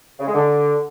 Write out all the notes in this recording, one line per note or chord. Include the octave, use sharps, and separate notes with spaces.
C#3
G#3
D3